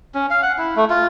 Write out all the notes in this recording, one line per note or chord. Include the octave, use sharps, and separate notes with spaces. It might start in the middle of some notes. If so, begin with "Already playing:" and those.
C#4
F5
F#5
E4
A3
F4